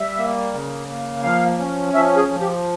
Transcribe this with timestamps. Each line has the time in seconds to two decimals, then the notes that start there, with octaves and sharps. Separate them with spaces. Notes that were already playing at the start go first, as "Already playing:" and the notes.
Already playing: G3 E5
0.18 A#3
0.54 C#3
0.88 A#3
1.23 F3 F5
1.59 C#4
1.93 F3 E5
2.16 G#4
2.28 F3
2.41 G4